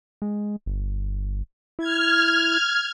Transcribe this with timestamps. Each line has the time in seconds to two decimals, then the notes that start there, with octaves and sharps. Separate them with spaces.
0.22 G#3
0.66 G1
1.79 E4 F6 G#6